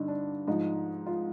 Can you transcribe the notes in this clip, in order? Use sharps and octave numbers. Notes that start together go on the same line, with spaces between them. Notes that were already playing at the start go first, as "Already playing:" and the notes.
Already playing: G2 D3 D#4
D4
G#2 F3 D#4
F4